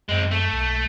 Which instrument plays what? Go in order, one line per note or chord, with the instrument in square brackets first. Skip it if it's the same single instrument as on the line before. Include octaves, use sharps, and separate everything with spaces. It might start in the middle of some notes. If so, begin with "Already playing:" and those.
[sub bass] F#2 [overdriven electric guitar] G#3 C4
[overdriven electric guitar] A3
[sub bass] B1